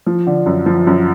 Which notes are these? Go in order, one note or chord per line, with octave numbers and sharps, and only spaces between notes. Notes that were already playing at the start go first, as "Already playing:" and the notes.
F3
D3
F#2
F3
F#2